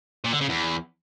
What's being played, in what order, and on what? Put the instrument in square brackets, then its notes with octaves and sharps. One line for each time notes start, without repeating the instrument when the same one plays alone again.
[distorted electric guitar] A#2
D3
C#3
E2